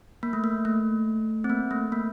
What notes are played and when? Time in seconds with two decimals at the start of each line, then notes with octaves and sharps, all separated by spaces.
0.23 A#3
0.33 A3
0.44 A#3
0.65 A3
1.44 C4
1.50 A#3
1.71 A3
1.92 A#3